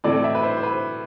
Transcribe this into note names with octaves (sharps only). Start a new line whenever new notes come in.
A2 E3 A3 C4 D5
E5
B4
C5
C5
B4